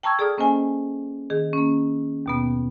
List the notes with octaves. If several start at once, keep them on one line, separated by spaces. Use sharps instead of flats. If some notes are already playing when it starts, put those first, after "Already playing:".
G5 A5 A#5 C#6 E6 G#6
G#4 A4 D5 A#5 D#6 F6
A#3 C#4 C5 D#5 G#5
D#3 G#4
A#3 C#4
D#2 B2 B3